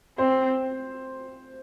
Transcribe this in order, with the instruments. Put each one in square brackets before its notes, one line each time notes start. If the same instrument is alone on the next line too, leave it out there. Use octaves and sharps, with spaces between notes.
[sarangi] C4 [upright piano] C5